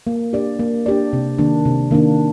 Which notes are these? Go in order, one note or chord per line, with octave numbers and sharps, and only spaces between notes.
A#3
D4 G4 D5
A#3
D4 G4 D5
C3
D#3 A#3 D4
C3
D#3 A#3 D4